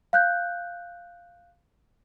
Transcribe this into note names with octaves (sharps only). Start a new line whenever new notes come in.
F5 F#6 G6